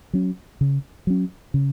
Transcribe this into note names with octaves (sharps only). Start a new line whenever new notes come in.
F#3 C#4
C#3
F#3 C#4
C#3